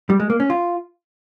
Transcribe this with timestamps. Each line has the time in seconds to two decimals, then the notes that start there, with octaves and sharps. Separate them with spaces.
0.10 G3
0.20 G#3
0.30 A#3
0.40 C#4
0.50 F4